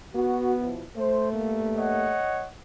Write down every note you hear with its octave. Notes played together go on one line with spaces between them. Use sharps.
B3 F#4
B2 F3 E4
A3 C5
G2 A#3
C#5 D#5 F#5